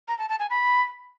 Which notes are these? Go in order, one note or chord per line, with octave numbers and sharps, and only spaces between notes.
A#5
A5
A5
G#5
B5